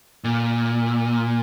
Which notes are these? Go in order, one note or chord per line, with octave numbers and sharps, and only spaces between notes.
A#2